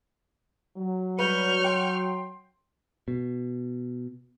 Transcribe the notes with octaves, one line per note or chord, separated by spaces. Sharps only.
F#3
G3 B4 C#6 F6 G6
G5 C6
B2